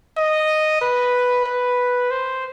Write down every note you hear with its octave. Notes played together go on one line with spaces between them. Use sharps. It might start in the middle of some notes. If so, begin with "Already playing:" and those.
D#5
B4
B4
C5